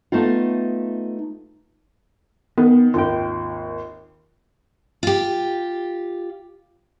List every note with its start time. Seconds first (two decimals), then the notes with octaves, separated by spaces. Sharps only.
0.12 A3 B3 D#4 F4
2.58 D#3 B3
2.94 G#1 D#2 F4 G5
5.03 F4 G4